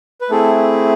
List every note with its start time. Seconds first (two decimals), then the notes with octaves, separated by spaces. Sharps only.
0.21 B4
0.30 A3 C4 E4 G#4 A4